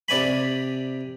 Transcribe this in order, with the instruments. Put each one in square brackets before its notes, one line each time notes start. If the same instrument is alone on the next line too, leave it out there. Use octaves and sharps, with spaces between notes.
[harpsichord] C3 D5 G#5 B5